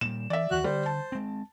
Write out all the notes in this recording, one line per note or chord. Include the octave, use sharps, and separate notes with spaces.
A#2 G3 E7
E3 D5 E5
D#2 E3 F#4 F#6
D3 G3 C5
A5
G#3 C4